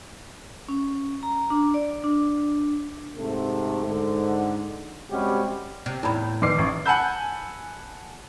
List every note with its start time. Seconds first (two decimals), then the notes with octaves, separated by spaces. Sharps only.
0.69 C#4
1.23 A#5
1.50 D4
1.74 D5
2.04 D4
3.17 G#2 C3 A3
3.85 G#2 D3
5.11 C3 G3 G#3 C#4 F#4 G4
5.86 C3
6.03 E2 A2 D#4 A#5 B5
6.42 D#3 B4 D5 C6 D6 C7
6.58 A1 C#6
6.86 F#5 G#5 A5 B5 E6 G6